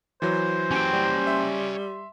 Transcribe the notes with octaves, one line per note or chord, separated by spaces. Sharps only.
E3 F#3 C5
C#4 G4 G5
G3
E5 C6